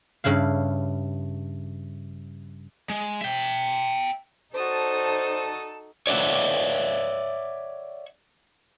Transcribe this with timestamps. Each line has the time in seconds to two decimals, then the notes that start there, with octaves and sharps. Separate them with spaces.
0.24 G2 C#3 E4 F5
2.90 G#3
3.21 E5 G5
4.55 D#4 F#4 A4 C5 D5 A5 D#6
6.07 C#5 D5 E5 F#5